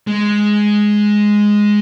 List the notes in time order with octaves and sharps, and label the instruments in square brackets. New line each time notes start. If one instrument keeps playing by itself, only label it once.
[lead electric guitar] G#3